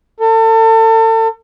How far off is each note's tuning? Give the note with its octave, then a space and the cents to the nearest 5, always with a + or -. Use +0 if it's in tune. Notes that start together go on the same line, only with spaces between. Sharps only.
A4 +35